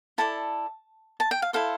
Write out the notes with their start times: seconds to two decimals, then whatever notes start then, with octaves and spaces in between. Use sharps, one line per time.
0.18 E4 A4 D5 A5
1.20 A5
1.31 G5
1.42 F5
1.53 E4 A4 C5 F5